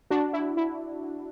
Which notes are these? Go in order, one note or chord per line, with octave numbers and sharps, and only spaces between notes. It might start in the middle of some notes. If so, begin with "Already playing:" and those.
D4 F#4
E4
E4